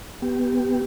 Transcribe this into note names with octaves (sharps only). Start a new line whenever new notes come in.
B3 G4